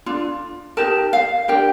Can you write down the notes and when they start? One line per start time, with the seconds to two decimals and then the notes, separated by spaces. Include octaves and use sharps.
0.06 D4 F4
0.77 D#4 G4 A#4 A5
1.13 F5
1.48 D4 G4 A#4 G5